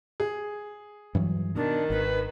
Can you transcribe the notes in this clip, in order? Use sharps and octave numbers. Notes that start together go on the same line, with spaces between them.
G#4
G2 E3 F#3
B2 D#3 D4
G#1 B4